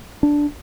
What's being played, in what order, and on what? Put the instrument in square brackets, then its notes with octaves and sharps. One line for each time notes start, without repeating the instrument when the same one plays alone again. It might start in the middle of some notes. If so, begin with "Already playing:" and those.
[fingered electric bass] D4